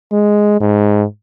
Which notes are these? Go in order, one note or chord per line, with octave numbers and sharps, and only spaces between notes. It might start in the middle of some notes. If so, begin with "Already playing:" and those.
G#3
G#2